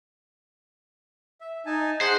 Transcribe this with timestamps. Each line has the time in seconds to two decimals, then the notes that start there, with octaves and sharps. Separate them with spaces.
1.41 E5
1.66 D#4 G#5 A5
2.01 G#4 C5 F#5 F#6